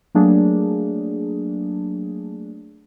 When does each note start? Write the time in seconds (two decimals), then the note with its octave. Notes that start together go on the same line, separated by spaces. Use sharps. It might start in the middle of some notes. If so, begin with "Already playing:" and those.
0.15 F#3 A3 A#3 D4 G#4